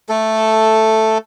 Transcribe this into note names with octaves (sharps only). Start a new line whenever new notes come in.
A3 A4